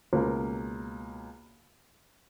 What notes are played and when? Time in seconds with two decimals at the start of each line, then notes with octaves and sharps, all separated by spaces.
0.13 C#2 B2 A#3